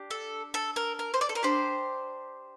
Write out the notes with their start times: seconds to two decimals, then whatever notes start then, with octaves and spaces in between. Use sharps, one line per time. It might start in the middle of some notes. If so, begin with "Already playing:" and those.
Already playing: D4 G4
0.11 A4
0.54 A4
0.76 A#4
0.99 A#4
1.14 C5
1.21 D5
1.29 A4
1.35 A#4
1.43 D4 G4 C5